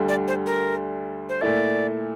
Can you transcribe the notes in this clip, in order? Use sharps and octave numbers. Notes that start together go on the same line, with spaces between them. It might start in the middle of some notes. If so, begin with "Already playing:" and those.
Already playing: D2 D3 G3
D5
C5
A#4
C5
A#2 A3 E4 A4 D5